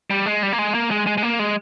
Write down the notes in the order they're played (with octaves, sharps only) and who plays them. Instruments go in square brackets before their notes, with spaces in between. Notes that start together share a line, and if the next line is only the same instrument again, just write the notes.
[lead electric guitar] G3
G#3
G3
A#3
G#3
A#3
G#3
G#3
G#3
A#3
G#3